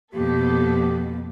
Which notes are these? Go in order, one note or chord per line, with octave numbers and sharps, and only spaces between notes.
F2 B2 A#3 B3 G4 A4